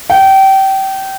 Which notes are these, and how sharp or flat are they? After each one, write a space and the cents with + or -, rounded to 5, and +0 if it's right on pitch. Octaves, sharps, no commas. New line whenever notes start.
G5 -25